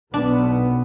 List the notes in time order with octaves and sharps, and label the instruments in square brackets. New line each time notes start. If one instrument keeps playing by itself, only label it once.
[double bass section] B1 B3 [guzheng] D4